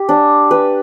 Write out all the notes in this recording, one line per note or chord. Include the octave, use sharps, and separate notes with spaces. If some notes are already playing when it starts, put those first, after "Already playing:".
Already playing: G4
D4
B4